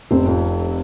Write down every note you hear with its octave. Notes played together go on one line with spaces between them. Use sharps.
F1 C4
F2